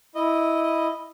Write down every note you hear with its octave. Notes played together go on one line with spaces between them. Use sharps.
E4 D#5